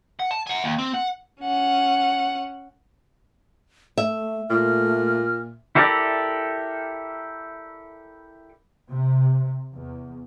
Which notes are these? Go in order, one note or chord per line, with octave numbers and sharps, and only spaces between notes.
F#5
A5
F#5 G#5
D#2
C4
F#5
C#4 F#5
A3 E5
A#2 A3 F6
E4 G4 A4 A#4 D5
C3
E2